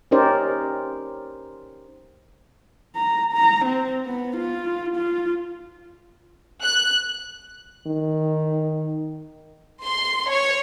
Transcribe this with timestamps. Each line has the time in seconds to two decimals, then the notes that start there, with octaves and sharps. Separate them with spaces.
0.11 C#4 D#4 G4 A#4 C5 D5
2.96 A#5
3.33 A#5
3.65 C4
4.06 B3
4.37 F4
4.97 F4
6.63 F#6
7.87 D#3
9.84 C6
10.30 C#5